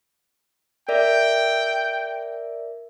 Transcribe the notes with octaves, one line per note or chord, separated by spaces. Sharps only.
A#4 D5 E5 G5